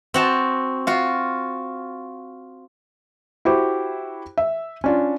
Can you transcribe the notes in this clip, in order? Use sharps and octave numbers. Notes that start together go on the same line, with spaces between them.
C4 F#4 A5
F4 F#4
E4 F#4 G4 C5
E5
C#4 D4 F4